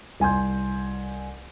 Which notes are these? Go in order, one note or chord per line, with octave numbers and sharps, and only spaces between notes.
C2 G#5 C6 G6